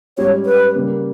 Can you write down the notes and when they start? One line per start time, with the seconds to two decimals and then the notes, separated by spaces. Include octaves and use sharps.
0.17 G#2 G3 C#4 G4 C#5
0.46 B4
0.75 C#3 G3 A#3